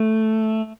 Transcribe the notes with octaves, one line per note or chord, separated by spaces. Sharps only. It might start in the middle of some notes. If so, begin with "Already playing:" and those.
Already playing: A3